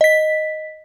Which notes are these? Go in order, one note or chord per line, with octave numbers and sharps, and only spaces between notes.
D#5 B6